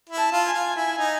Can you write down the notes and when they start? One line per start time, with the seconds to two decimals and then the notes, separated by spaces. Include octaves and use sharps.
0.09 E4
0.17 A5
0.32 F4
0.47 G#5
0.53 F4
0.76 E4
0.98 D#4